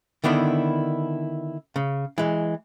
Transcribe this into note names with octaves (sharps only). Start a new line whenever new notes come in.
D3 D#3 B3 D4 E4
C#3
E3 G#3